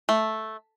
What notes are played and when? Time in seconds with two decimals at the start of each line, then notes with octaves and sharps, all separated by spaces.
0.09 A3